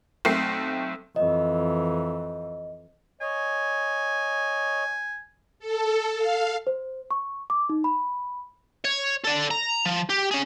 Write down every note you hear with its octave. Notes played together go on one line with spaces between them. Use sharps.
B1 A3 C4 C7
F2 E3 D#5
C#5 D#5 G#5
A4
F5
C5
C#6
D6
D#4
B5
C#5
A4 D5
A#5
F3
G4
C#4 G#4